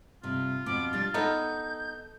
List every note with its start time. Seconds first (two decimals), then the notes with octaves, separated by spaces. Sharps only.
0.23 G2 C3 F4
0.66 F2 B2 B3 D6
0.93 G3 D4 A6
1.14 B3 D#4 A4 G6